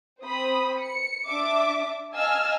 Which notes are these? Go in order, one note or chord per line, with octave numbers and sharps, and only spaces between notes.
C4 C5 B5 D#6
C#7
D4 E5 D6
D#5 F5 G#5 A5 E6 F6